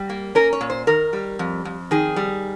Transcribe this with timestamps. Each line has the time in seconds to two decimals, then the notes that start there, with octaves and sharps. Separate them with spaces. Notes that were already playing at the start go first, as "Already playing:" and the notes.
Already playing: G3
0.10 A#3
0.35 C#4 A#4
0.53 C#5
0.61 A#2
0.70 C5
0.87 D#3 A#4
1.13 G3
1.39 F2
1.65 F2
1.91 D#3 G#4
2.16 G3